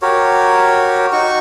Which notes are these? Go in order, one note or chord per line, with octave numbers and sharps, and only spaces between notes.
F#4 G4 A#4 C#5
D#4 F#4 C#6